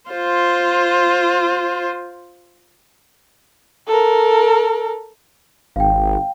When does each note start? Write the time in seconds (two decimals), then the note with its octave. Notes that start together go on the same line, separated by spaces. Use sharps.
0.10 F4 C5
3.88 A4 A#4
5.76 G#1 F5 G5